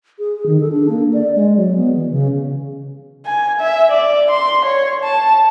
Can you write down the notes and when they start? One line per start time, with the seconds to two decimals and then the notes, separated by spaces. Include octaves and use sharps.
0.19 G#4
0.46 D#3
0.60 A4
0.72 D4
0.89 A#3
1.13 D5
1.36 G#3
1.56 F#3
1.75 B3
1.95 E3
2.11 C#3
3.26 G#5
3.60 E5
3.91 D5
4.30 C6
4.65 C#5
5.03 A5